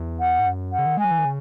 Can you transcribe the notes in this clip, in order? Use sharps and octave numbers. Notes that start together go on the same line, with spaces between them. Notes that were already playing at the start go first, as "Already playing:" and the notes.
Already playing: E2
F#5
G#2
F#2
F#5
C#3
D#3
G#3 G#5
F#3
E3
D#3
C#3